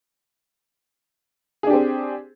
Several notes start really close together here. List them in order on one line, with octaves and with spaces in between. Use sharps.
G#4 D4 G4 C4